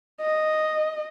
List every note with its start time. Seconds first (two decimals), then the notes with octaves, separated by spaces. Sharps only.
0.21 D#5